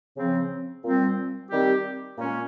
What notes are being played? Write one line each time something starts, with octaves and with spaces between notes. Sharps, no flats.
C#3 F3 C4
A#2 G3 C4
D#3 G3 C4 G4
A#2 G#3 C#4